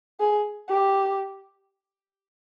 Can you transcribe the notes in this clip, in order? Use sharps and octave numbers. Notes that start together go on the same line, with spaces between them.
G#4
G4